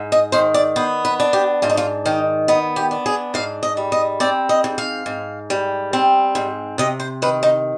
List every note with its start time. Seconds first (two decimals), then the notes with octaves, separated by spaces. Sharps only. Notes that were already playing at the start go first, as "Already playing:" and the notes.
Already playing: G#2
0.12 D#5
0.32 D#3 C5
0.54 D5
0.76 B3 C5
1.05 B4
1.20 D4
1.33 G4
1.62 G#2 F4
1.70 D#4
1.77 F4
2.06 D#3 D#4
2.48 B3 D#4
2.76 G4
2.91 D4
3.06 G#4
3.34 G#2 F5
3.63 D#5
3.77 G3
3.92 D#5
4.20 C4 D5
4.49 D#5
4.64 G#2
4.78 F5
5.06 G#2
5.50 G3
5.93 C4
6.35 G#2
6.78 C3 D#5
7.00 C5
7.22 D#3 B4
7.43 D#4